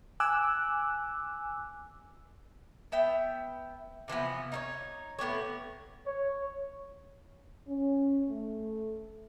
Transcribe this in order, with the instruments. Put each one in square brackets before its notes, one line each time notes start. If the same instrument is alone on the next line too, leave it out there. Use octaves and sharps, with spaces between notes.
[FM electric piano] G#5 D6 E6 F#6
[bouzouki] B3 E5 G5
C3 E3 F3 B3
D#4 E4 C#5
A2 B3 G4 C#5
[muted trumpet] C#5
[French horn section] C#4
A3